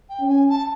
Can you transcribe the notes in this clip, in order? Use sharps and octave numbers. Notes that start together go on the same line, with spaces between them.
G5
C#4
G#5
A5